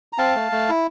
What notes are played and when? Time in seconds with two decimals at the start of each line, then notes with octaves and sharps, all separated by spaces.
0.13 A#5
0.18 C4 F5 A5
0.35 A3
0.52 A3
0.69 E4